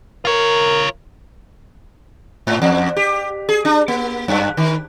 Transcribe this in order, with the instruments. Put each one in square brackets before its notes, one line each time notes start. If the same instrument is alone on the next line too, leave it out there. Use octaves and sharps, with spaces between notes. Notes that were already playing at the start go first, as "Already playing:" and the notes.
[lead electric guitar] F4 C#5 [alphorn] A#4
[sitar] G#2
E2
G4
G#4
D4
A#3
F#2
D#3